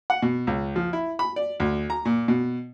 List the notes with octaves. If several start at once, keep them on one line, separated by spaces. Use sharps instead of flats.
F#5
B2
C#2
F3
E4
B5
D5
D2
A#5
A#2
B2